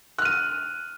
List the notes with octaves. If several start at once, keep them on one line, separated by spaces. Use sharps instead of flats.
F6 F#6 D#7